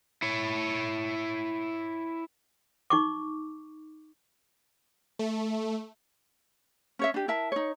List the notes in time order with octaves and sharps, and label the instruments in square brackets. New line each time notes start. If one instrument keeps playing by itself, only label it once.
[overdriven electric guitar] E4 C#5
[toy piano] D#4 C#6 D6
[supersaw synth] A3
[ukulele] C#4 C#5 E5
D4 G4
E4 A#4 E5 A5
D#4 C#5